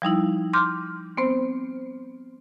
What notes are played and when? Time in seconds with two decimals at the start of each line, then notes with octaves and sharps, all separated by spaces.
0.02 F3 G3 D#4 E4
0.53 C6 D6 F6 G6
1.17 B3 C4 C5